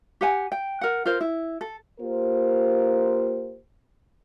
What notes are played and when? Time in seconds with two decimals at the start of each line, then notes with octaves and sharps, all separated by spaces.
0.21 G4 F#5 G#5
0.52 G5
0.81 A#4 F#5
1.05 F4 A#4 C5
1.21 E4
1.61 A4
2.00 A#3 F4 G4 A#4 C5